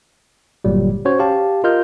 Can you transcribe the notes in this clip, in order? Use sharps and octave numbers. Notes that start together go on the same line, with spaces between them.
G1 A#2 F#3 G3
C#4 F#4 C5 C#5
G4 F5 A5
F4 A#4 D#5 F6 G6